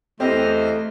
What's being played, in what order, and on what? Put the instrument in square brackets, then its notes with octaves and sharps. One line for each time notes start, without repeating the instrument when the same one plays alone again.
[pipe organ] E2 C5 F6 [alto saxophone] A3 [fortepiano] C4 G4 [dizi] D#5